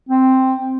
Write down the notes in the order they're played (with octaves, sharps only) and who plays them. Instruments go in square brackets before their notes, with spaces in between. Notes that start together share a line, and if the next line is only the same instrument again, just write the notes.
[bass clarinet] C4